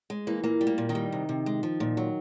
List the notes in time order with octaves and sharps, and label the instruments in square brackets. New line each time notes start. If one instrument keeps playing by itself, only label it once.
[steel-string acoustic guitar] G#3
E3 A#3
A#2 A#3
G3
A#3
A#2
D#3 D#4
G3
C3
C3
G#3
F3
A#2
F#3